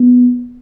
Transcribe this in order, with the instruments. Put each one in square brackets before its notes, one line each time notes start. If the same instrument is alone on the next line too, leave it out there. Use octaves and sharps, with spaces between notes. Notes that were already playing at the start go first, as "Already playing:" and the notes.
Already playing: [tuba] B3